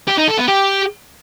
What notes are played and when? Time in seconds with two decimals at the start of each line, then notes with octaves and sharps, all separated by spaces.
0.08 G4
0.18 D#4
0.28 A4
0.38 B3
0.48 G4